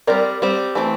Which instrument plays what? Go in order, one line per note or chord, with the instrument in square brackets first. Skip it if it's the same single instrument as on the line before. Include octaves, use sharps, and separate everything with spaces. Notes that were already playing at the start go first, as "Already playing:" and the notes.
[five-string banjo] G3 C4 A#4 D5
G3 C4
E3 A3 C4